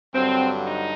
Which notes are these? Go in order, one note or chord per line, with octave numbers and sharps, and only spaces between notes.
G2 D3 F#3 C4
D#4